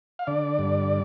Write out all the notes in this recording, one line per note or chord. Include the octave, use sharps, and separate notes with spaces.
F5
D3 D5
G2